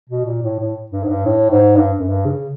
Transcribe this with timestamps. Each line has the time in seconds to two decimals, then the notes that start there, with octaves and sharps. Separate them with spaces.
0.09 B2
0.25 A#2
0.42 A2
0.59 A2
0.92 G2
1.03 G#2
1.08 G2
1.25 A2
1.50 G#2
1.76 G2
1.99 F#2
2.09 G2
2.25 C#3